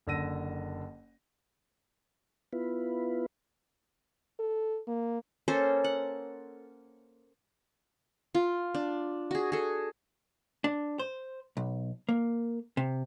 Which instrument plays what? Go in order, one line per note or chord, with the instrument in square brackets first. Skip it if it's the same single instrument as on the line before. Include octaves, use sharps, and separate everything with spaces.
[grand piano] F#1 D3 E6 A#6 D#7
[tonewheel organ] B3 E4 F4 B4
[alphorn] A4
A#3
[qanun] A#3 C#4 A4 C5
F#5
F4
D4
F#4 G#4
G#4 A4
[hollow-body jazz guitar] D4
C5
B1
A#3
C3